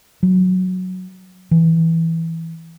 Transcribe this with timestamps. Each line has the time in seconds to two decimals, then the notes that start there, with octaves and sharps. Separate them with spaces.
0.23 F#3
1.51 E3